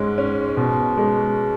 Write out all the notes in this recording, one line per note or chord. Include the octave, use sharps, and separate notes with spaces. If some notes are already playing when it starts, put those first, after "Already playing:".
Already playing: G#2 G#3 C#4
C#4
B2
G#3